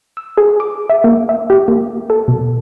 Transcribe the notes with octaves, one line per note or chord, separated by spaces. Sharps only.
E6
G#4
D6
E5
A#3
E5
G4
A#3
A4
B2